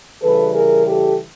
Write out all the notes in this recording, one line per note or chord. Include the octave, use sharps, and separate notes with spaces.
C#3 E3 G3 A4 B4
G#4 A#4
G4 A4